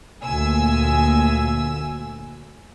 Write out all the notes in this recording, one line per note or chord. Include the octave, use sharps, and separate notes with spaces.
D2 A#2 G#5 E6